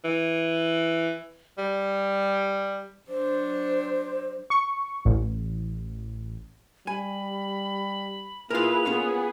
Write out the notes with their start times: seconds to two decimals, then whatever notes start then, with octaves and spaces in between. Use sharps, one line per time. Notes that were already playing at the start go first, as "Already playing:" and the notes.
0.05 E3
1.58 G3
3.08 F#3 D4 C5
4.50 C#6
5.05 A1
6.87 G3 G#5 B5
8.50 A#3 E4 F4 G#4 A#4 B4 F7
8.85 B3 C#4 F4 G#4 C#5